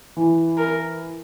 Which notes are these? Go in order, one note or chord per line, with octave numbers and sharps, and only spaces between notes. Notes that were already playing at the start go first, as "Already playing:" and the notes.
E3
A#4